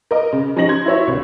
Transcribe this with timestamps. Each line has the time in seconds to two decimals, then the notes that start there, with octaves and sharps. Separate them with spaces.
0.11 A#4 D#5
0.32 C#3
0.56 F3 C#4 D#4 G4 A#6 F#7
0.69 C6 G#6
0.85 E4 F#4 C#5 E5
1.07 C2 D3